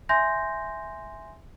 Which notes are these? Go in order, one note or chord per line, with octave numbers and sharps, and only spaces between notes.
E5 G#5 C6 G6 A#6